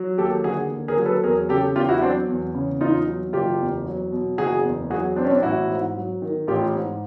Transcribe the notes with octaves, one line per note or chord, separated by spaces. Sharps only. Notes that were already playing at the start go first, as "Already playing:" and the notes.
Already playing: F#3
D#2 G4 A4
D3 F#4 G#4
D#2
G#4 A#4
F#3
A4 B4
E2 G#4 A#4
C#3 G4 A4
E2 F4 G4
E4 F#4
F#3 C4 D4
E2
C#3
E2 D#4 F4
F#3
F#1 F4 G4
E2
F#3
B2
F#1 F#4 G#4
E2
F#3 F#4 G#4
B2 C4 D4
C#4
C4 D4
A1 E4 F#4
G#2
F#3
D#3
A1 F4 G4
G#2